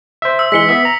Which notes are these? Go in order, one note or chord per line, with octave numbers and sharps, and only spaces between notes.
C5 E5
E6
E3 G#3 B6 C#7 G7
B3 E5
A#5